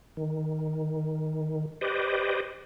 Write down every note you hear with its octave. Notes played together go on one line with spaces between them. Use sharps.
D#3
G4 B4 C5 D5 D#5